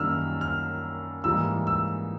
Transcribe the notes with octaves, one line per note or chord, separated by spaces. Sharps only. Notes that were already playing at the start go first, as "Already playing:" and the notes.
Already playing: F#2 D#3 G3 A#3 E6 F6
F6
G#2 E3 G3 A#3 E6
E6